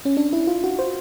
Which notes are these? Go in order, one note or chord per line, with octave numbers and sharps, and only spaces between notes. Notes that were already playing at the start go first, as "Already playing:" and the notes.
C#4
D4
E4
F4
F#4
C5